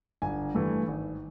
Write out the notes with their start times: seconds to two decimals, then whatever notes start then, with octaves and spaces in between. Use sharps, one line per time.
0.22 G1 G#5
0.55 G2 E3 A3
0.88 G#1